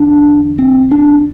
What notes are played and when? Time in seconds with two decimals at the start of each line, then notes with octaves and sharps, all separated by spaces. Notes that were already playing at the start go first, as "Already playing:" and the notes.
Already playing: E2 D3 D4
0.59 C4
0.91 D4